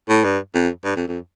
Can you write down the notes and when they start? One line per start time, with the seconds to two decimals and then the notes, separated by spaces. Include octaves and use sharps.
0.09 A2
0.24 G2
0.55 F2
0.84 G2
0.96 F2
1.08 F2